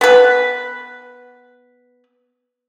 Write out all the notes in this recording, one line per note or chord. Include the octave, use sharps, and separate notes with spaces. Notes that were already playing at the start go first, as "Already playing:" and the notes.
B3 B4